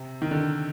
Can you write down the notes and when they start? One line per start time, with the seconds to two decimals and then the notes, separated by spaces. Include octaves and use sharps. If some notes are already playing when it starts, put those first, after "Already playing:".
Already playing: C3
0.22 D#3
0.31 D3